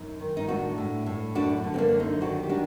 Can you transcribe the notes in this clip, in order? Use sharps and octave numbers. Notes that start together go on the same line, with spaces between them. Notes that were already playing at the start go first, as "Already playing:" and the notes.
Already playing: F#2 D#4
D#3
D#4
A2 D4 F#4
A2
A2
F#2 D4 F#4
D3
C4
A#3 D4
F#2
C4 D#4
D#3 D4 F#4
G4
D#3 D4 F#4